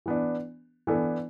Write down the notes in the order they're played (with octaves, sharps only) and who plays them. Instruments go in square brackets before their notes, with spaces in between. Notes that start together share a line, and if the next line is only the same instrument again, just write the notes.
[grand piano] E3 B3 D4
E3 B3 D4 A4